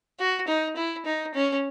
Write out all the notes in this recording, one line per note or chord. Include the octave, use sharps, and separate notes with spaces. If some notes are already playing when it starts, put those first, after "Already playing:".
F#4
D#4
E4
D#4
C#4